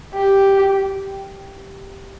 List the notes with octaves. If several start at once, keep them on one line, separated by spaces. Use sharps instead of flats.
G4